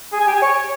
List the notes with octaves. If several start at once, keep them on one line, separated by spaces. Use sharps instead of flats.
G#4
G#5
G4
G#5
C#5